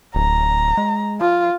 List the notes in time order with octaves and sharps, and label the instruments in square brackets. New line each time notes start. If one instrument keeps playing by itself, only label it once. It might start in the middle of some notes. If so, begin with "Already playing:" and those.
[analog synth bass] D1 [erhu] A#5
[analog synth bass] G#3
[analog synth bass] F3 [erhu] F4